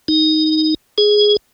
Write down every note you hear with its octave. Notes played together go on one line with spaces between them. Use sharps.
D#4
G#4